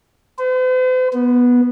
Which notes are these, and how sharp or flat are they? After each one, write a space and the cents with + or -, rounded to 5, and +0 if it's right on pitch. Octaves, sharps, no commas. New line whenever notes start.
C5 -45
B3 -10